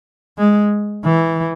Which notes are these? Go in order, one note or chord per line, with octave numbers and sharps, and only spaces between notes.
G#3
E3